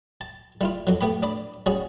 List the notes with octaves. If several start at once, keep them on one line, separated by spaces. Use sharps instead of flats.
A5
G3 E4 F4
F2 F#3
A3 B3 G4 B5
D4 D5 B5
G3 C#4 F#4 G#4